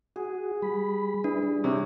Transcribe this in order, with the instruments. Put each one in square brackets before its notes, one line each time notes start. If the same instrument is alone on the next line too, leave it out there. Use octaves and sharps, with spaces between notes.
[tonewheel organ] F#4 [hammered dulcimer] G#4
[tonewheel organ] G3 B5
[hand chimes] D4 [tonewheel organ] E4 B4
[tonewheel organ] G3
[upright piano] C3 [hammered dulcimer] C#5